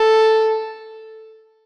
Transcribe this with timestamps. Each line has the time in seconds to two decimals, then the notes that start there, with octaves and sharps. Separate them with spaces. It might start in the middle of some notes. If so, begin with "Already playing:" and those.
Already playing: A4